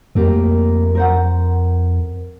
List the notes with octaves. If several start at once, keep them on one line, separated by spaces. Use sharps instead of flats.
F2 A3 A#3 G4
A#4 C5 F#5